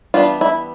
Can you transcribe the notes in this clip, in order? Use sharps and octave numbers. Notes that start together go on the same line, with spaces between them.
E3 G3 B3 D4 F4
E4